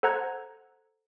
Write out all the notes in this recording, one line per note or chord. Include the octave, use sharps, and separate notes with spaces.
A4 C5 F#5 A#5 F#6 G#6